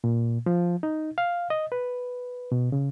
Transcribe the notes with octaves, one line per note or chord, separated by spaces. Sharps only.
A#2
F3
D#4
F5
D#5
B4
B2
C#3